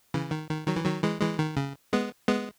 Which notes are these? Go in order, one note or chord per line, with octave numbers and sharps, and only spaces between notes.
C#3 E3
D#3
D#3
D#3 F#3
E3
D#3 F#3
E3 G#3
E3 G#3
D#3
C#3
G#3 B3
G#3 B3